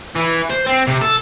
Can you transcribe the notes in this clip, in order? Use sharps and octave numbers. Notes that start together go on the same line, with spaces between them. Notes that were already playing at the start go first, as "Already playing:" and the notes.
E3
C5
C4
C3
A4